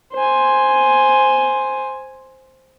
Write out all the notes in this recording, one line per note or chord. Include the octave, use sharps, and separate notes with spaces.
C5 G#5